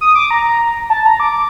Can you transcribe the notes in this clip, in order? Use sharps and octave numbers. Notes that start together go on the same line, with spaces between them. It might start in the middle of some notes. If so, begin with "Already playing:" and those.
D#6
D6
A#5
A5
A#5
D6